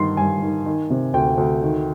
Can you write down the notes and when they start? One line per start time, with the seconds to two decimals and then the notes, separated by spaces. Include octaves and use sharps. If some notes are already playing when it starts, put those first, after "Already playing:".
Already playing: G2 D#3 C6
0.17 G2 G#5
0.42 D#3
0.65 D#3
0.90 C3
1.13 D2 G5
1.38 D2
1.63 D#3